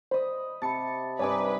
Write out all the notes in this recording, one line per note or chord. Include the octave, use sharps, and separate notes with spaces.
C5 D#5 B5
C3 A5 B5 A6 C#7
G2 C3 D#4 B4 C#5 G#5 D6